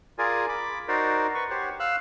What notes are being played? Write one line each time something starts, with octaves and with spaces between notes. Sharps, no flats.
F4 G#4 A#4 D5 G#5
B5 D6
D#4 F#4 A#4 C5 D5
B4 C#6
G4 C5 C#5 F#5
F5 E6 F#6